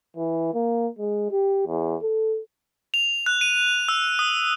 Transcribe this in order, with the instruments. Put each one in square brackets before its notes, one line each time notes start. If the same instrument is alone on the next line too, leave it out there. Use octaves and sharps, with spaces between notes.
[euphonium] E3
A#3
G#3
G4
E2
A4
[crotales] F7
F#6
D#7
E6
D#6